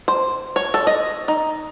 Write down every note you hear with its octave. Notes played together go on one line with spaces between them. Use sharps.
C5
C#5
A4
D#5
D#4